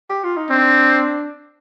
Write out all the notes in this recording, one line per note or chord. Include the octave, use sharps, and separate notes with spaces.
G4
F4
D#4
C4 D4